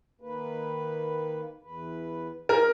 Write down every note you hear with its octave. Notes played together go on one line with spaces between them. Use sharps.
D#3 A#3 B4
E2 B4
C4 D#4 G4 A#4